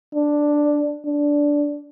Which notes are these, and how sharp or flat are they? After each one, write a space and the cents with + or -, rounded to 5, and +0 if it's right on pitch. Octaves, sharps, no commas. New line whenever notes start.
D4 +5
D4 -10